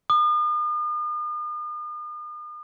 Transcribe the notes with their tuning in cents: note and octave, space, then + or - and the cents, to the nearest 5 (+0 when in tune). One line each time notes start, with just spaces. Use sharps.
D#6 -45